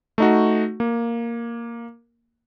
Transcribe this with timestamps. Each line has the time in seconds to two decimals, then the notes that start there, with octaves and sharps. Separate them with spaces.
0.18 A3 D#4 F#4
0.80 A#3